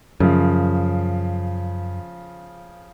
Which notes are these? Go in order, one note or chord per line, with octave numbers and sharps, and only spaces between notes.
F#2 C#3 F3